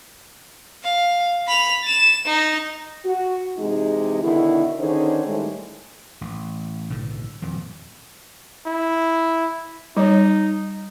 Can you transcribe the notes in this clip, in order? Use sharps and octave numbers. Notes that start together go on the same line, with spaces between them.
F5
B5 F7
A6 E7
D#4
F#4
C3 E3 G#3 D#4 G4 G#4
B2 D3 D#3 E4
D3 D#3 C#4 D#4 G#4 C5
A2 D#3 G3 G#3
A1
B1 A2 D3
D#1 F2
E4
G3 D#4 C#5